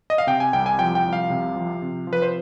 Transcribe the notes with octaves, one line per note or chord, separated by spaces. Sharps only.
D#5
F5
C3 G5
G#5
C2 G5
G#5
F3 G5
G5
C2
F5
C3
F3
C3
F3
B4
C5